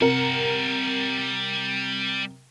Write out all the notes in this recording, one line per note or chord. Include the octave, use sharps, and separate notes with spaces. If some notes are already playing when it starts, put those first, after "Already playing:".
C3 G3 A#4 F#5